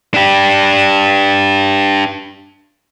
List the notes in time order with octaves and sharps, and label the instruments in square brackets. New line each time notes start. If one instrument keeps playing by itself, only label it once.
[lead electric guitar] D4 G4